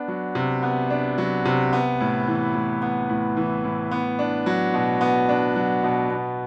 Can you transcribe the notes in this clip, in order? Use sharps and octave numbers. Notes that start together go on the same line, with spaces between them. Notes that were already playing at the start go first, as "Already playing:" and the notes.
Already playing: B3 D4
F#3
C3
B3
D4
F#3
C3
B3
A2
E3
A2
B3
A2
E3
A2
B3
D4
F#3
B2
B3
D4
F#3
B2
B3